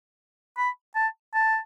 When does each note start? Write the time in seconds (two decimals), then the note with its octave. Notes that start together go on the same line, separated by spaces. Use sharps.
0.58 B5
0.95 A5
1.34 A5